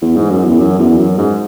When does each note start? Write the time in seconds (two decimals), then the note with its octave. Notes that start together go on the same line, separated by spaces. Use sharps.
0.02 E2
0.16 G#2
0.30 F#2
0.45 E2
0.59 F#2
0.79 E2
0.97 F#2
1.18 G#2